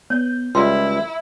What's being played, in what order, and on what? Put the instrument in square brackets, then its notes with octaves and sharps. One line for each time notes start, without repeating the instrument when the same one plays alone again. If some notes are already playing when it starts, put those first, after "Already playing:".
[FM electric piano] B3 G6 [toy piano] C#5
[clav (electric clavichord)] C#2 G3 [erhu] E4 [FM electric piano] F4 [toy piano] C6